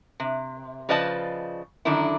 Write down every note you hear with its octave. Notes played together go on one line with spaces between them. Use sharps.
C3
C#3 F3 B4 D5 D#5 A5
F#2 D3 D#3 D4 E4